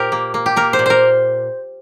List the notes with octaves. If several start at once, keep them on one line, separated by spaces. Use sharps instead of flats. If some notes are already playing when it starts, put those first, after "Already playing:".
Already playing: A#2 G4 A#4 C5
A#3
A#3
G4
A#3 A#4
C5
A#2
A#4 C5